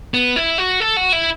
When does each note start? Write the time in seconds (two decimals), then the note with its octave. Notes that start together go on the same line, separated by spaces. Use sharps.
0.14 B3
0.36 E4
0.58 F#4
0.80 A4
0.97 F#4
1.13 E4